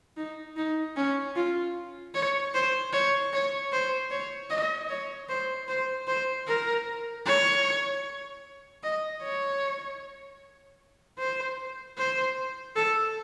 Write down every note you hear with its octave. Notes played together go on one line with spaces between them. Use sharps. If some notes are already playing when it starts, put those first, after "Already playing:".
D#4
D#4
C#4
F4
C#5
C5
C#5
C#5
C5
C#5
D#5
C#5
C5
C5
C5
A#4
C#5
D#5
C#5
C5
C5
A4